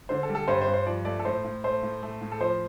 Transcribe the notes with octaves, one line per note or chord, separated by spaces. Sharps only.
D3 C5
A4
G3
A4
G2 C5
C5
G2
C5
F3 D5
A3 D5
A4
A2 C5
A2
A3 C5
A2
A3
A2
A4
F3 C5